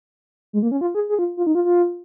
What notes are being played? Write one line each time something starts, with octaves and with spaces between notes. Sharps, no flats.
G#3
A#3
C#4
F4
G#4
G#4
F4
F4
D#4
F4
F4